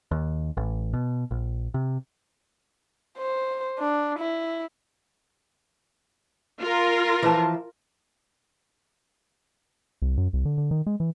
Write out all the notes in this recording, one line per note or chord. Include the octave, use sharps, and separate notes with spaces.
D#2
A1
B2
A#1
C3
C5
D4
E4
F4 A#4
E3 F3 A5
C2
F#2
C2
D3
D3
D#3
G#3
E3